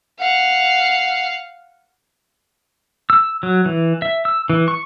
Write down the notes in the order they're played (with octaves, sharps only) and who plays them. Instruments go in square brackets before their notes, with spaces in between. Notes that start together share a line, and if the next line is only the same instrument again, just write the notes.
[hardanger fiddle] F5 F#5
[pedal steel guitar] E6
F#3
E3
E5
E6
E3
C#6